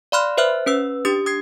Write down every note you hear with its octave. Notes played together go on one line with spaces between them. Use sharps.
D5 F5 B5 C6 F6 F#6
B4 C5 E5 F6 F#6
C#4 B4 E6
D4 G4 D#6 A6
D#6 G#6 C7